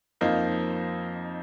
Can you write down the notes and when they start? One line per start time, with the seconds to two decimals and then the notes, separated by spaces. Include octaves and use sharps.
0.21 F2 F3 A#3 D#4